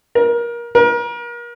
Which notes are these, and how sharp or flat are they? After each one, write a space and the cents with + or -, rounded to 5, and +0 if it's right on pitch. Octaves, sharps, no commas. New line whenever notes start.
A#4 +25
A#4 +35